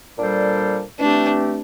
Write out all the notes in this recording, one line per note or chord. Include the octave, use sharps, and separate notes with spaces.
A#2 G3 D4 A4 C5
E3 A3 C4 D4 G4